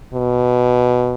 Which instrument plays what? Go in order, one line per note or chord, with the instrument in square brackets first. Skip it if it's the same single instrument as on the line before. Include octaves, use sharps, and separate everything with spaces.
[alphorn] B2